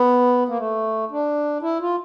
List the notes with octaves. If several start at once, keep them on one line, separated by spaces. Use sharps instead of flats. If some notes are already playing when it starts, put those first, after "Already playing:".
Already playing: B3
A#3
A3
D4
E4
F4